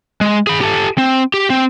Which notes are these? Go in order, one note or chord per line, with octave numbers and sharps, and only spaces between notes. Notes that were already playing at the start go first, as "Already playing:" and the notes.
G#3
G#4 B5
G4 A4
C4
G4
C4